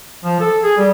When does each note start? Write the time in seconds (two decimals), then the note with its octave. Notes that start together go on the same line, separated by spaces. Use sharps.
0.24 F3
0.40 A4
0.63 G#4
0.78 G3